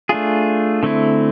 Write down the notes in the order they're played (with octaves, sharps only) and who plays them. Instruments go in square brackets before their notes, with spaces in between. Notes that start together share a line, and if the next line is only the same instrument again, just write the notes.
[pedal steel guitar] A3 D4 F4 G#4
D3 A3 C4 E4